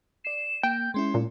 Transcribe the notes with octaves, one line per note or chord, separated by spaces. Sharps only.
D5 C7 E7
A#3 G5 G6
G#3 C#4 E4 C6
A#2